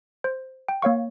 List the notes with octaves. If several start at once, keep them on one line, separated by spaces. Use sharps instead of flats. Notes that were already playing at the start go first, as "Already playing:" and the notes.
C5
G5
A#3 C#5 F5 C#6